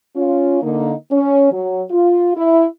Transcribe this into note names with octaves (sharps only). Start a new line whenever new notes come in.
C#4 F4
D3 A#3 D#4
C#4
F#3
F4
E4